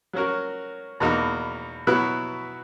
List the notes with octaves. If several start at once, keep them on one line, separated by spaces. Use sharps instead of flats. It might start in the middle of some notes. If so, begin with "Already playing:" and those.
F#3 C#4 F#4 A#4
E2 B2 A#3 D#4
B2 F#3 B3 E4 B4